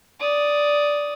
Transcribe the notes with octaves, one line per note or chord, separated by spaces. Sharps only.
D5 D#6